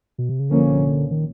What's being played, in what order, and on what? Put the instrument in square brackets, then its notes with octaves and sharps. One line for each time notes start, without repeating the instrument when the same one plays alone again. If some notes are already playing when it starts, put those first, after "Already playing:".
[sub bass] B2
C3
C#3
[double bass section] C2 A#2 F3 A#3 C#4 [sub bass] D3
[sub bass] D#3